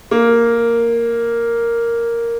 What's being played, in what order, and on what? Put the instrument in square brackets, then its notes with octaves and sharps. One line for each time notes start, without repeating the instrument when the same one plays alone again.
[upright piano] A#3